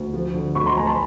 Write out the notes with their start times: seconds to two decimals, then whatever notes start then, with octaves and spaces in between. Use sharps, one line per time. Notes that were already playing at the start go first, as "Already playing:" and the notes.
Already playing: D2
0.14 F3
0.34 D3
0.55 D2 B5 C#6
0.66 A#5 C6
0.77 D2 G#5 A#5
0.87 A5 B5